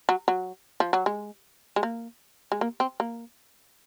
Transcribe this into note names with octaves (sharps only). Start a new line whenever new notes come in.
F#3
F#3
F3
F#3
G#3
G#3
A#3
G#3
A#3
C4
A#3